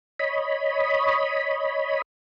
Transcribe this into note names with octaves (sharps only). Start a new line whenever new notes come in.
C#5 D#5 B5